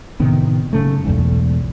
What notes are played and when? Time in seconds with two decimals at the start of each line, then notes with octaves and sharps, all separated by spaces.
0.20 A2 C3 D#3 B3
0.73 F#2 C#3 A3
1.05 B1 E2 G#2